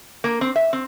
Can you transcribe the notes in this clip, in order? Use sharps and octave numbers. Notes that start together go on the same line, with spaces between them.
A#3
C4
E5
C4